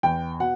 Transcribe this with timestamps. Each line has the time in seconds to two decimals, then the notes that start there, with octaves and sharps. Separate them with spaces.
0.03 E2 G5
0.40 B2 F#5